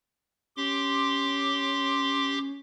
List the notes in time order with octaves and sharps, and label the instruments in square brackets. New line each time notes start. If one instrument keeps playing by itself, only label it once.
[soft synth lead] C#4 [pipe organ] G4 C6 D6